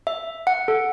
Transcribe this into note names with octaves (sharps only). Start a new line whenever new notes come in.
E5
F#5
A4